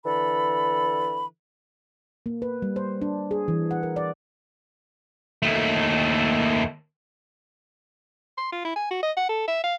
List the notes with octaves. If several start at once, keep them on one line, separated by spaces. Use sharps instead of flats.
D3 E3 A4 B5
A#3
B4
G3
C5
D4
G#4
E3
F#5
A#4
D5
D#2 A3
C6
F4
E4
G#5
F#4
D#5
F#5
A4
E5
F5